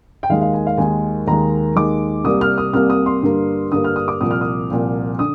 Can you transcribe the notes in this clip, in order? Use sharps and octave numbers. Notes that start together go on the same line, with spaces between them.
G5
D#2 D#3 G#3 F5
F5
G#5
F5
D#2 D#3 G#3 G#5
D#2 D#3 G#3 A#5
D#2 D#3 G#3 D6
C2 C3 G3 A#3 D#6
F6
D#6
C2 C3 G3 A#3 F6
D#6
C6
G2 D3 G3 A#3
G2 D3 G3 A#3 D#6
F6
D#6
D6
C2 A#2 F3 D#6
F6
D#6
C2 A#2 F3
D3 D#6